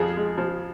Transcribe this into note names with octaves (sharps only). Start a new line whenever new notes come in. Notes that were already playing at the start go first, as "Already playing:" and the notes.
Already playing: F2 F3 G#4
G#3
F3